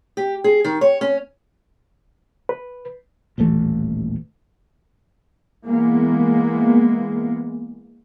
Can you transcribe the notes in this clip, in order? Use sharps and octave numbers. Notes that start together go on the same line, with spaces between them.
G4
G#4
D#3
C#5
C#4
B4
D#1 A1 E3 A3
E3 G#3 A#3 B3